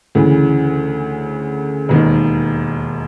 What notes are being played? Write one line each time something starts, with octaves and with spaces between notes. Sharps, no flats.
D2 C#3 E3
E1 D#2 D#3